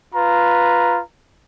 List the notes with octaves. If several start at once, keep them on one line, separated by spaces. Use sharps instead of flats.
F4 B4 A#5